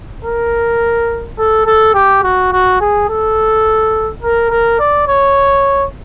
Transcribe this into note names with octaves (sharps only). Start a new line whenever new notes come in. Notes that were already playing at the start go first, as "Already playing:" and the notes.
A#4
A4
A4
G4
F#4
F#4
G#4
A4
A#4
A#4
D5
C#5